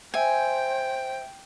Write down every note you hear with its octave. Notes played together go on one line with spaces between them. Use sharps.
C5 E5 G5 G#5 G#6